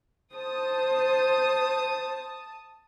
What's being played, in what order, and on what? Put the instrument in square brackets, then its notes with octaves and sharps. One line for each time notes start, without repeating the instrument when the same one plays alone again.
[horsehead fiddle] C5 [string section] A5 D#6